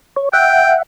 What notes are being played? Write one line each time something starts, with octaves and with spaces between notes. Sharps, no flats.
C#5
E5 F#5 G5